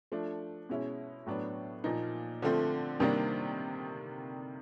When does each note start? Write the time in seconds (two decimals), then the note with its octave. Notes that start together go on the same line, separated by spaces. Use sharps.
0.12 F3 A3 D4
0.69 B2 G#3 C#4 E4
1.26 A2 F#3 B3 D4
1.84 A#2 F3 A#3 D#4
2.42 D3 F3 A3 C4
2.99 C3 D#3 G3 A#3 D4